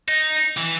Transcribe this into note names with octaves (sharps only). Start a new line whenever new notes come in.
D#4
E3